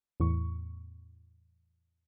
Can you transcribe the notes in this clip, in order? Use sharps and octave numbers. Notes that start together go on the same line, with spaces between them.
E2 A2 C#6